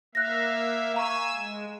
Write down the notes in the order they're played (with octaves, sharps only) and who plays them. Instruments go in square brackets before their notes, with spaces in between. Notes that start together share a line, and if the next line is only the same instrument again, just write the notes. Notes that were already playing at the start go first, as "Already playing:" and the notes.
[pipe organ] A#3 E5 F5 [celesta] F#6 A#6
[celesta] F5 A#5 C#6 [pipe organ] G#5 E6
[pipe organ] G#3 [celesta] E7